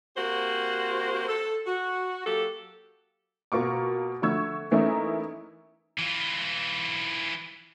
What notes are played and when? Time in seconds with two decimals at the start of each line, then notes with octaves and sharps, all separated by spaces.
0.16 A#3 C4 F#4 G4 C5
1.27 A4
1.66 F#4
2.26 F#3 A#3 G4 A4
3.52 B2 A#3 F4 C#6 D6
4.22 D3 F3 A3 C#6 E6 G#6
4.71 E3 A3 A#3 C#4 D#4 E4
5.99 E3 F4